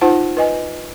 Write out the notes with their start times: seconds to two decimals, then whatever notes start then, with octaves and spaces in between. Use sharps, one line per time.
0.01 D#4 F4 C5 F#5 A5
0.37 B4 D#5 G#5